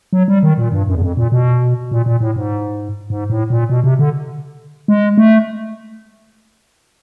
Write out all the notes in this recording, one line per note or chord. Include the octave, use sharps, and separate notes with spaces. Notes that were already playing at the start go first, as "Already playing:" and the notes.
F#3
G3
D#3
A#2
G2
F#2
E2
F2
A#2
B2
A#2
A#2
A2
G#2
G#2
A2
A#2
B2
C3
D3
G#3
A3